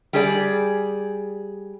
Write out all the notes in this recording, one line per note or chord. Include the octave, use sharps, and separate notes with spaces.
G3 G#4 D5